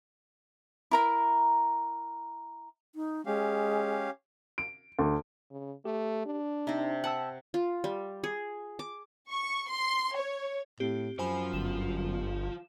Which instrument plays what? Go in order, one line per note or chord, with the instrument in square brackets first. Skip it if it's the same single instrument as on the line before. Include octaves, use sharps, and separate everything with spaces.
[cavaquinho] E4 A#4 A#5
[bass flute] D#4
[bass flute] G#3 [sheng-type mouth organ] C#4 G4 F5
[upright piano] D7
D2
[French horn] C#3
[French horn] A3 [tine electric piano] G4
[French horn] D4
[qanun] C3 C4 [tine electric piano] D#4
[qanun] F#5 [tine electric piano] G5 A5 E6
[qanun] F4
G3
G#4
D6
[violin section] C#6
C6
C#5
[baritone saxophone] A2 [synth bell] C4 G4
[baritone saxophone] F#2 [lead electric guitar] F3 [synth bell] C5 G#5 B5
[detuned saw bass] G1 [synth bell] E7